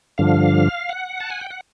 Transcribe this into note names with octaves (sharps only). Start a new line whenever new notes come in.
G2 D3 F3 F5
F#5
A5
G#5
G5
F#5